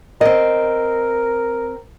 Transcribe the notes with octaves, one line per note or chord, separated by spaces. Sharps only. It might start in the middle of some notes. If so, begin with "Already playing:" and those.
C4 A#4 D#5